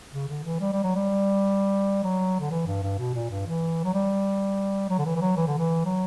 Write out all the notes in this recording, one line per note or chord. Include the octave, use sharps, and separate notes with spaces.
C#3
D3
E3
G3
G3
F#3
G3
F#3
D3
E3
G2
G2
B2
A#2
G2
E3
F#3
G3
F#3
D3
E3
E3
F#3
E3
D3
E3
F#3